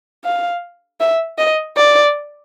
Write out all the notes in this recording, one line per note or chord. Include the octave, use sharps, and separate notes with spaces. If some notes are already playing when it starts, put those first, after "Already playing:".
F5
E5
D#5
D5